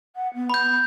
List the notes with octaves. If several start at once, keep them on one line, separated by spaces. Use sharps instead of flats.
F#5
B3
B5 G6